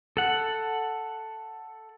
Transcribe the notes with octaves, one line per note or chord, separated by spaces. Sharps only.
A4 F#5